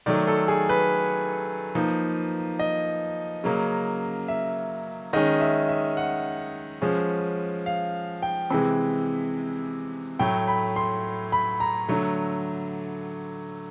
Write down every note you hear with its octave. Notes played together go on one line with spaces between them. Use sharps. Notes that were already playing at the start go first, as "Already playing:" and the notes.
D#3 F#3 A3 D5
A4
G#4
B4
F3 A#3 D#4
D#5
C#3 F#3 A#3
E5
D#3 G#3 C#4 D#5
E5
E5
F#5
F3 G#3 C#4
F5
G5
C3 E3 G#3
A2 F#3 A3 G5
B5
C6
B5
A#5
D3 F#3 A3